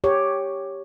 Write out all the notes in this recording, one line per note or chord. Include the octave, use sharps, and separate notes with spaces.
G4 C#5